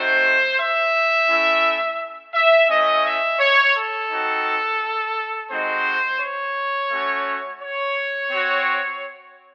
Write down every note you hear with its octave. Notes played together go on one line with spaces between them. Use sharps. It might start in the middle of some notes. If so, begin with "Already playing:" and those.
Already playing: A3 C4 D#4 F#4 C5
E5
A3 C#4 E4
E5
A3 C#4 E4 D#5
E5
C#5
A4
C4 D#4 F#4
G#3 C4 D#4 F#4 C5
C#5
A3 C#4 F#4
C#5
C4 F#4